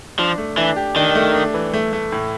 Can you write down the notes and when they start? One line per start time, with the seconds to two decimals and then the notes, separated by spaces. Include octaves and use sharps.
0.19 F3 D4
0.38 A3
0.58 E3 D4
0.76 G4
0.96 D#3 D4
1.15 A3
1.35 D4
1.54 E3
1.73 A3
1.93 A3
2.12 A2